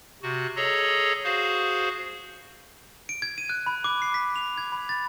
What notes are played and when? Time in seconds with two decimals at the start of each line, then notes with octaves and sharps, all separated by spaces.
0.23 C3 F#4
0.56 G#4 A4 C#5 D#5 A#5
1.24 F#4 G#4 C5 F5
3.09 D7
3.22 G#6
3.38 D#7
3.49 F#6
3.66 B5
3.84 D6
4.02 C7
4.14 B6
4.36 F7
4.58 G#6
4.72 B5
4.89 A6